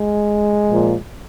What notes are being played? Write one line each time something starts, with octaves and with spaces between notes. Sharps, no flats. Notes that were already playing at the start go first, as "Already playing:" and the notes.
Already playing: G#3
A#2 F3